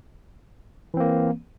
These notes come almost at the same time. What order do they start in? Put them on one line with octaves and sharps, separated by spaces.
E3 C4 A#3